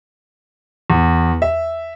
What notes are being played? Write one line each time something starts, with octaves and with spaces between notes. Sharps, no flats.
E2
E5